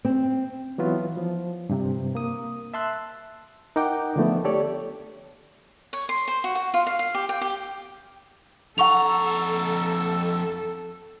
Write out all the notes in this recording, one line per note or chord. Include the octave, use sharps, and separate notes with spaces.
C4
E3 F#3 B3 F4
F3
G2 C3
A#3 D#6
E5 A5 C6 E6 F#6
D#4 A#4 D#5 F#5 G5 D6
D3 F3 A3 B3
G4 A4 C#5 D5
C#5
C6
C5
F#4
F#4
F4
F5
F5
G4
G5
G4
F2 A4 F#5 A#5 C#6 F7